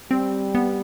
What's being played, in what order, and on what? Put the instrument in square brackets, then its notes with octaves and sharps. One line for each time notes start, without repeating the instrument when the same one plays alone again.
[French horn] G3 [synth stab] C4
[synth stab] B3